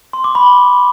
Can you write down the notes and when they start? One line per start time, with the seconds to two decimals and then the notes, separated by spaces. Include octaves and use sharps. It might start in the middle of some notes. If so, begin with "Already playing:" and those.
0.13 C6
0.24 D6
0.35 B5